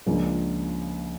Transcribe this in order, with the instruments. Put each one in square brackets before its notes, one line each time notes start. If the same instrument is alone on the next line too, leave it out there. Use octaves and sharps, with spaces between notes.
[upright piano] C#2 C#3 F3 A#3 D4